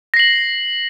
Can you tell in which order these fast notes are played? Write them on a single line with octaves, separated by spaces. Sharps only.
A#6 C7 F#7